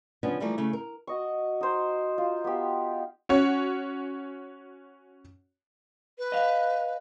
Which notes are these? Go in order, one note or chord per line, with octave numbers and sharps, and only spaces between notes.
C#3 F3 B3 C#4 D4
E3 F3 G3 A3 A#3
C#3 A3
A#4
F#4 D#5 C#6
D#4 C5
F4
B3 G4
C#4 F#4 C#5
B4
D#5 F5